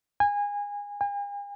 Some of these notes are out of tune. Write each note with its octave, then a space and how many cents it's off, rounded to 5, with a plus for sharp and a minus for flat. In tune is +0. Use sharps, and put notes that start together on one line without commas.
G#5 -25
G#5 -45